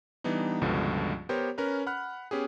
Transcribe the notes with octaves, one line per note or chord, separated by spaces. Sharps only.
E3 G3 B3 D4 D#4
C#2 G2 B2 D3 F3
B3 G4 A#4 C5 C#5
C#4 A#4 B4
F#5 B5 F6 F#6
B3 C#4 G4 G#4